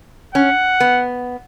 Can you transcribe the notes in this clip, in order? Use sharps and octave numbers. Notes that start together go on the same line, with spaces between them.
C#4 F#5
B3